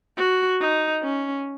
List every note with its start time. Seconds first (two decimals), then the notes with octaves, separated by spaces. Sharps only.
0.17 F#4
0.60 D#4
1.03 C#4